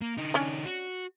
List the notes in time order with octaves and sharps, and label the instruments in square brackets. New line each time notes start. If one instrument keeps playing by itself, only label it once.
[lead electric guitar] A#3
D3 D#4
[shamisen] C#4 D4
[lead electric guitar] F#4